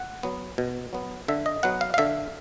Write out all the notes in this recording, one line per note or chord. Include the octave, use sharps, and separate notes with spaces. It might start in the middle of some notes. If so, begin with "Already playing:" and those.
Already playing: F#5
F#3 B3
B2
F#3 B3
D3 E5
D#5
F#3 B3 F#5
F5
F5
D3 E5